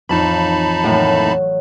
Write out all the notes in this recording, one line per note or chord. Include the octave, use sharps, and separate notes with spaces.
A1 F2 D#4 F4 A5 B5
D#2 A2 F#3